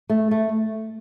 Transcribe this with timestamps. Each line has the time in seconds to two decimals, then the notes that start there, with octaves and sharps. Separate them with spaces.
0.09 A3
0.31 A3